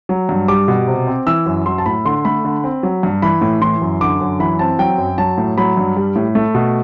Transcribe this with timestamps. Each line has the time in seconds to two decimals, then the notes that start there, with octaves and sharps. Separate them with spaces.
0.09 F#3
0.29 G2
0.48 G3 D6
0.68 B2
0.88 C3
1.07 C4
1.27 E3 E6
1.46 F#2
1.66 F#3 C6
1.78 A5
1.86 A2 B5
2.05 D3 C6
2.25 A3 B5
2.45 D3
2.64 C4
2.83 F#3
3.03 G2
3.22 E3 B5
3.41 A2
3.61 E3 C6
3.82 F#2
4.01 D3 D6
4.21 F#2
4.40 E3 B5
4.59 C4 A5
4.79 F#3 G5
4.98 F#2
5.18 F#3 A5
5.38 A2
5.58 F#3 B5
5.77 G2
5.97 G3
6.16 A2
6.35 A3
6.55 B2